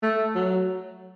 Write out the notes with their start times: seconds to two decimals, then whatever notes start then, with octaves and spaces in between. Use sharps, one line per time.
0.03 A3
0.35 F#3